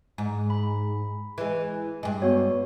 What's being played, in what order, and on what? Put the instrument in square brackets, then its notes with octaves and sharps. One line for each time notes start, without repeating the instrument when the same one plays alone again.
[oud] G#2
[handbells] B5
[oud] E3 G#3
G2 G#3
[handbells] B3 F#4 C#5